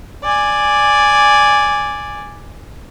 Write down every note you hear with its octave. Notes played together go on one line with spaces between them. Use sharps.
D5 G#5